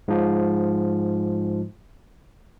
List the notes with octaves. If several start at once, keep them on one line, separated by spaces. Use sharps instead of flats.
G#2 F3